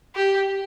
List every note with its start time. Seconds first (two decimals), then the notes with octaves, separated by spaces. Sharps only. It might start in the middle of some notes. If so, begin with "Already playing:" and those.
0.15 G4